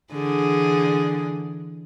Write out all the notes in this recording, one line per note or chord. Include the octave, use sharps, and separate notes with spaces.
D3 E3 G#4